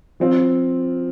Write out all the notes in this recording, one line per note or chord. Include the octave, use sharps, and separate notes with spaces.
F3 C4 F4